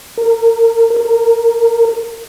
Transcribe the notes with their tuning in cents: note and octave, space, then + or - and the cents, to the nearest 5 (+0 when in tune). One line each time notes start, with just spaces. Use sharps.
A#4 -25
A#4 -20